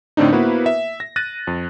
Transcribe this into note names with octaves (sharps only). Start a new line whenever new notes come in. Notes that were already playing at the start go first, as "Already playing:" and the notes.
A2 D3 C4 D4 D#4
A#3 B3 E4 F#4 B4 C5
E5
A#6
F#6 A6 A#6 D#7
F2